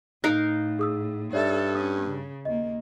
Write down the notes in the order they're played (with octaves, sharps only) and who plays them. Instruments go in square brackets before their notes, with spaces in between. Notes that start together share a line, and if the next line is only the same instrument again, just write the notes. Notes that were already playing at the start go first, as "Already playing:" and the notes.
[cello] A2 [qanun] D#4 A#4 F5 [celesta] F#6
[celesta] G#4 D#6 E6
[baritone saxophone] G2 [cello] A4 [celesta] C#5 D5 E5
[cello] C#4 [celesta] D#6
[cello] C#3
[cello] D#2 A#3 [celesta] D#5